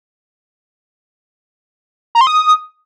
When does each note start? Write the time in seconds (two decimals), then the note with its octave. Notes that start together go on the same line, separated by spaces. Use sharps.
2.15 A#5
2.21 C6
2.27 D#6